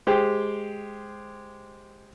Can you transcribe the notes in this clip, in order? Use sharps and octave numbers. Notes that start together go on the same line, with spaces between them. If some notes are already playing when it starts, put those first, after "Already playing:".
G#3 G4 C5